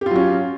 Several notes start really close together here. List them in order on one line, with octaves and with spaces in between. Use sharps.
G4 F4 F#3 C#4